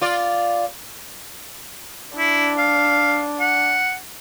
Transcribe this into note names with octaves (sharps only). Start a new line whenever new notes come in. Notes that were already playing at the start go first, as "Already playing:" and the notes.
F4 D5
D4 E4
F5
F#5